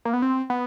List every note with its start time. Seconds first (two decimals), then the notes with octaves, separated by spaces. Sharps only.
0.05 A#3
0.13 B3
0.22 C4
0.50 B3